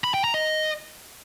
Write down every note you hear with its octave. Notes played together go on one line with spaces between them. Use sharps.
B5
G5
A#5
D#5